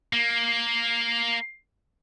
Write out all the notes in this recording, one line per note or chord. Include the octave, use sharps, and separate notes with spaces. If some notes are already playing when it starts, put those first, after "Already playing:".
A#3